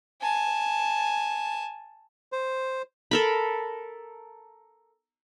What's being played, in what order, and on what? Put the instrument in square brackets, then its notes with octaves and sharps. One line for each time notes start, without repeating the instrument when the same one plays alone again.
[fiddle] G#5 A5
[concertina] C5
[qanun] A4 A#4 B5